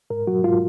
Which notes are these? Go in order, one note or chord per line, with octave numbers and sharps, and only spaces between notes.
G#2 A#4
F#3 F#4
G#2 F4